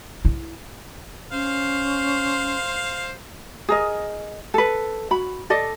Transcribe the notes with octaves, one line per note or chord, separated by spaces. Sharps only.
E4
C#4 C5 F5
G#4 A#4 D#5
A4 B4
F#4 B5
A4 D5 D#5